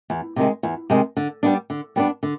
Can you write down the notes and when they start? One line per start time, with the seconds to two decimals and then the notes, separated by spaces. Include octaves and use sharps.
0.10 E2
0.36 C3 D#3 G#3
0.63 E2
0.90 C3 D#3 G#3
1.17 D3
1.43 G3 B3 D4
1.70 D3
1.96 G3 B3 D4
2.23 D3